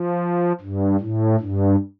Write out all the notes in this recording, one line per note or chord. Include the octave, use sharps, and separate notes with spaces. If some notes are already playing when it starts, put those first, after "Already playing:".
Already playing: F3
G2
A2
G2